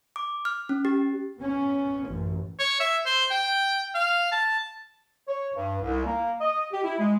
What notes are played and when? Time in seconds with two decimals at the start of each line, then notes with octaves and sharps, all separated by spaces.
0.16 D6
0.45 F6
0.69 C#4
0.85 G4
1.40 B3 C#4
2.07 A1 F#2
2.59 C#5
2.80 E5
3.06 C5
3.31 G5
3.95 F5
4.32 A5
5.28 C#5
5.54 G2
5.82 C2
6.05 A#3
6.41 D#5
6.72 G4
6.84 E4
6.99 G#3